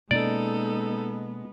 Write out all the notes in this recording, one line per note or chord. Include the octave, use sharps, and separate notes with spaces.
B2 G#3 A#3 B3 C#4 D#4 A4 D5